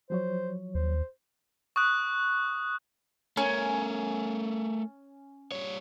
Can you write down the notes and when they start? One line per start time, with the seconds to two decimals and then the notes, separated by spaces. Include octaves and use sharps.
0.10 F3 F#3 C5 C#5
0.75 D#2 C5
1.76 C#6 D#6 F#6
3.37 A3 C#4 A#4
5.52 G3 C#5